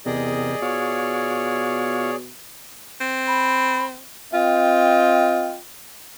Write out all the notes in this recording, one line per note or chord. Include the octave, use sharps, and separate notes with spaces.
E2 C3 G4 G#4 A#4 D5 D#5
B2 F4 C#5 F5 C#6
C4
B5
C4 F4 D#5 G5